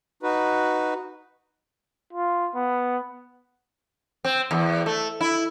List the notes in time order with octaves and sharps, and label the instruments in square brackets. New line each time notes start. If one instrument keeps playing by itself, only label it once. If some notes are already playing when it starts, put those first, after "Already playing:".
[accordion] D#4 F#4 B4
[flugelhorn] F4
B3
[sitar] C4
E2
A3
E4